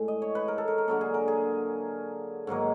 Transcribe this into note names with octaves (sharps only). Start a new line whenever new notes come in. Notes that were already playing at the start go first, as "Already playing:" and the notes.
Already playing: A2 G#3
D#5
C#5
B4
A#4
A4
A#4
A#4
D3 F#3 A#3 A4
G#4
A#4
G#4
G#2 D#3 F#3 A#3